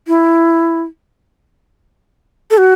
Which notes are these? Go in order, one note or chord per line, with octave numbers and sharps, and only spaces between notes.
E4
A4
F#4